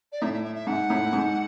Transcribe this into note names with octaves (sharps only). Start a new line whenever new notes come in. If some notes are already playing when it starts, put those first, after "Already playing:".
D5
A2 E5
E5
E5
E5
G#2 F#5
A2
G#2